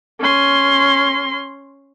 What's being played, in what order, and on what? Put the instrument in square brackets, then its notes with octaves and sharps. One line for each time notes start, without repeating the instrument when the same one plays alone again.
[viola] C#4 C6